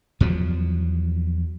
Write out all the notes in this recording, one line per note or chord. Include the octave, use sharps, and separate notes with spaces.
E2 F3 F#3